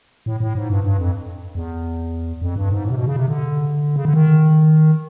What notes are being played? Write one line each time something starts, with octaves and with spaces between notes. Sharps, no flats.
A2
A2
G#2
G2
G2
F2
E2
F2
G2
G#2
A2
C3
B2
C#3
C3
D3
C#3
D3
D#3